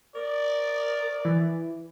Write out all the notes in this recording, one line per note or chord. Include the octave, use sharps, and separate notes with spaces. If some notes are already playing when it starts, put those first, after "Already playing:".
A#4 D5
E3